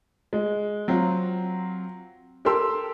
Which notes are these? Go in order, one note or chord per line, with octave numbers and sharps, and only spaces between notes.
G#3
F#3 C4 F4
G4 A4 A#4 G5 C6 E6